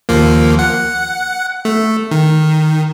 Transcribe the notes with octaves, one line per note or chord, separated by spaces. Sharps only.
D#2 F3 A#3
F#5
A3
D#3